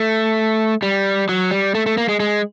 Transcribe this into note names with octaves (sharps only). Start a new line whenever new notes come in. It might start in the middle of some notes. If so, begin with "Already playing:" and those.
Already playing: A3
G3
F#3
G3
A3
A3
A#3
G#3
G#3